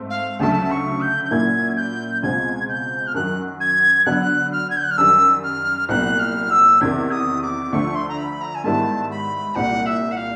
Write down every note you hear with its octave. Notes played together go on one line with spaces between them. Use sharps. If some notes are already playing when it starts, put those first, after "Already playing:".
Already playing: G#2 A3 C4
F5
D2 C#3 F#3 A3 A5
C#6
G6
G6
A#2 F#3 A#3 C#4 E4 G#6
G6
C#2 B2 G#3 C4 F4 G#6
G6
F6
F#2 D#3 F#3 F#6
G#6
D3 F#3 B3 F#6
F6
G#6
G6
F#6
F6
F#2 D#3 G3 E6
F6
C2 A#2 F#3 B3 F#6
F6
E6
E2 C3 D#3 G#6
D#6
D6
D2 D3 F3 A3 C#6
C6
A#5
B5
A#5
G#5
G#2 D#3 G3 B3 E4 A5
B5
C2 A#2 G3 F#5
E5
F#5
F5